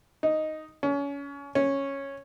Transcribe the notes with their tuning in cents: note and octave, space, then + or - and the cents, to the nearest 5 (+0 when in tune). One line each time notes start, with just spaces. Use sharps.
D#4 +0
C#4 +30
C#4 -5